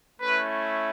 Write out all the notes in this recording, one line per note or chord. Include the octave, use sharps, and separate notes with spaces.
A3 C#4 E4 B4